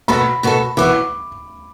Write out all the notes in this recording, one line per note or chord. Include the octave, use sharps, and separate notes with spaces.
B2 B3 F#4 A4 B5
B2 B3 F#4 A4
E3 B3 F#4 D6